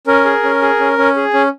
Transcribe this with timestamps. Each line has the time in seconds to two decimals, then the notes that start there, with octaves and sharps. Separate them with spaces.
0.07 C#4 A#4
0.25 G#4
0.44 C#4
0.62 G#4
0.80 C#4
0.98 C#4
1.16 G#4
1.34 C#4